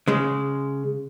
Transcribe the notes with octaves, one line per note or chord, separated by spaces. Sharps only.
C#3 G#3